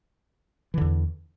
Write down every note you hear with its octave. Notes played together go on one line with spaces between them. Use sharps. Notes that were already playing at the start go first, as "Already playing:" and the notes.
E2 D3 E3